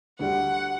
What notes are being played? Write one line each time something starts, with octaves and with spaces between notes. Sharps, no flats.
D2 D3 G3 F#5